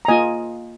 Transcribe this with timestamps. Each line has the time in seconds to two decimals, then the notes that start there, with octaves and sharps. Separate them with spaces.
0.05 A#5
0.08 A#3 F4 D#5 G#5